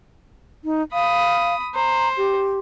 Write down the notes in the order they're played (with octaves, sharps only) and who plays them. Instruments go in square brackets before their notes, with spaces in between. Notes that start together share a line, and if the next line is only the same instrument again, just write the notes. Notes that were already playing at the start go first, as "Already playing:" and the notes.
[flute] D#4
[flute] F5 [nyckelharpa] B5 D#6
[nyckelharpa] C5 [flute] A#5
[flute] G4